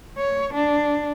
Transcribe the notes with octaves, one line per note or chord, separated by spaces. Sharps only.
C#5
D4